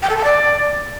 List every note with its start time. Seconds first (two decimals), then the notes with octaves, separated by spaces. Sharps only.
0.02 G5
0.09 A4
0.17 A5
0.24 D5